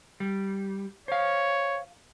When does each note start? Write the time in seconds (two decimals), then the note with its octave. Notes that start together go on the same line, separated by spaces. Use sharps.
0.20 G3
1.08 C5 C#5 F5